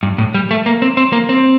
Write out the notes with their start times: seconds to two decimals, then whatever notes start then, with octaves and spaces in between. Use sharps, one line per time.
0.03 G2
0.18 A2
0.34 G3
0.51 A3
0.66 A#3
0.82 C4
0.97 C4
1.13 A#3
1.29 C4